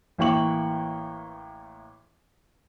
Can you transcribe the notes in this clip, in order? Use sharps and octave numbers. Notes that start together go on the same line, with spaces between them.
A1 E3 A#3 G5 C#6 F#7